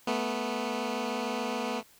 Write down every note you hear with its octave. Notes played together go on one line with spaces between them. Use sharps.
A3 B3